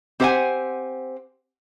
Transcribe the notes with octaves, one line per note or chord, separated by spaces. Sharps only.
C4 G4 C5 F5 F#5 G#5